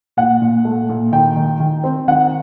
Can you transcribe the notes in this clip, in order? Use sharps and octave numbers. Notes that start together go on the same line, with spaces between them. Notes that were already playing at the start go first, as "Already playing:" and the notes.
A#2 F#5
A#2
A3
A#2
D#3 G5
D#3
D#3
C4
D#3 F#5